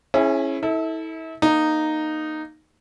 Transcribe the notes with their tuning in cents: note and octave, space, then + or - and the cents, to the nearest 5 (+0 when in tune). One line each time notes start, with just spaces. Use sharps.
C#4 -25 E4 +0 G#4 +20
E4 -35 A4 +0
A#3 +0 D#4 -10